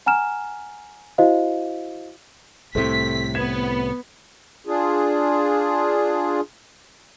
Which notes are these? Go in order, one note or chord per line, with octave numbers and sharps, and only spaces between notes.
F#5 G#5 A#5 F6 E7
E4 F#4 C5 D#5 F5
C2 A2 C3 A3 C4 B6
B3 G#6 B6 E7
D4 F4 G#4